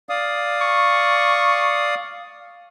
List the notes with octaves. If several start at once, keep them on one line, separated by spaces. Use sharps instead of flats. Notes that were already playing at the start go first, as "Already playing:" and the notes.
D5 F5 D#6
C#6